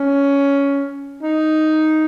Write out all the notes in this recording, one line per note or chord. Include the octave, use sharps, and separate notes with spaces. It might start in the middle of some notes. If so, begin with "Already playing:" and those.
Already playing: C#4
D#4